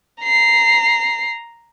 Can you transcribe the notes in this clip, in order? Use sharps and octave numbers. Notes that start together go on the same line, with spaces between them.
A#5 C7